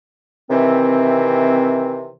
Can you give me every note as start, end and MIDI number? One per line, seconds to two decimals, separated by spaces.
0.50 2.10 48
0.50 2.10 51
0.50 2.10 52
0.50 2.10 60